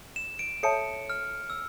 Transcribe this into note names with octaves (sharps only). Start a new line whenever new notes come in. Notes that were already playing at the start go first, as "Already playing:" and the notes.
E7
D7
A4 C#5 E5 A5 C#7
F6
E6